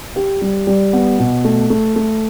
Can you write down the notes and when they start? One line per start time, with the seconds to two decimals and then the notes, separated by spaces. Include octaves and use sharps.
0.16 G4
0.42 G3
0.67 G3
0.93 B3
1.19 B2
1.45 A3
1.70 A3
1.96 A3